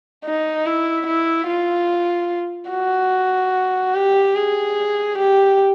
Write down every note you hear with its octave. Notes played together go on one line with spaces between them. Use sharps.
D#4
E4
E4
F4
F#4
G4
G#4
G4